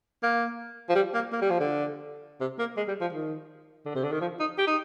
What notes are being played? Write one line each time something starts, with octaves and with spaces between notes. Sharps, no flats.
A#3
F3
G3
A#3
A#3
G3
F3
D3
C3
A#3
G#3
G3
F3
D#3
D3
C3
D3
D#3
F3
D#4
G4
D#4